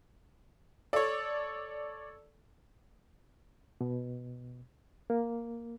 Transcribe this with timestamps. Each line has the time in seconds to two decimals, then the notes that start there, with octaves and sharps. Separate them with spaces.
0.93 A4 C#5 D5
3.81 B2
5.10 A#3